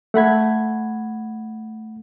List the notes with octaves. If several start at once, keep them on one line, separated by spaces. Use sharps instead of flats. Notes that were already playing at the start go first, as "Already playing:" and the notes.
A3 F#5 B5 G#6